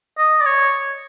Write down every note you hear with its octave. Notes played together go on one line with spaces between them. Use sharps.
D#5
D5
C#5